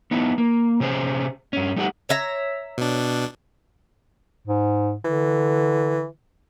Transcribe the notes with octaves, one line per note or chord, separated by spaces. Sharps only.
B3 D#4 E4
A#3
C3 C#4 G#4 A#4 C5
G2 C#4
G3 A3 D#4 G4 F#5
C#5 E5 A#5
B2 D4
G#2
D3 E3